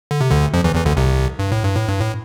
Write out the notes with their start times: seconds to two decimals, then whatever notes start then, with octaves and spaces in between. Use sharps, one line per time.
0.11 D3
0.21 C3
0.30 D2 D3
0.54 F2 F3
0.64 E2 E3
0.75 E2 E3
0.85 D2 D3
0.97 C2 C3
1.39 G2
1.52 A2
1.64 G2
1.76 A2
1.89 G2
2.00 A2